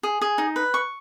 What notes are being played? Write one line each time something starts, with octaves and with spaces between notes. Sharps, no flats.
G#4
G#4
D#4
B4
C#6